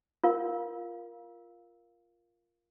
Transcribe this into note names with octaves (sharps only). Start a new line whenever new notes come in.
F4 A#4 F5